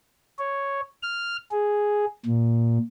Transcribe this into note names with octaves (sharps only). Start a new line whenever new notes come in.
C#5
F6
G#4
A#2